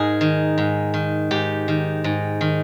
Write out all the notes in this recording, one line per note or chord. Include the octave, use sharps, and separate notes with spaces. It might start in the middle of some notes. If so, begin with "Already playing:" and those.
Already playing: G#2 D#4 G#4 A#4
D#3
G#2
D#3
G#2 G4
D#3
G#2
D#3